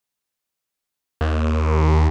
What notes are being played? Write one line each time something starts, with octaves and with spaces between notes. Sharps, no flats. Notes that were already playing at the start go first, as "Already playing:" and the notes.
D#2